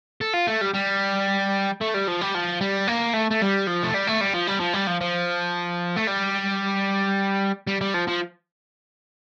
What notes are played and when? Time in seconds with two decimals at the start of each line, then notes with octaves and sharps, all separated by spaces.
0.21 A4
0.34 F4
0.47 A3
0.61 G3
0.74 G3
1.81 A3
1.94 G3
2.08 F3
2.21 G3
2.35 F3
2.61 G3
2.88 A#3
3.14 A3
3.31 A3
3.41 G3
3.67 F3
3.83 A3
3.94 G3
4.07 A3
4.21 G3
4.34 F3
4.47 G3
4.60 F3
4.74 G3
4.87 F3
5.01 F3
5.96 A3
6.07 G3
7.67 G3
7.81 G3
7.94 F3
8.07 F3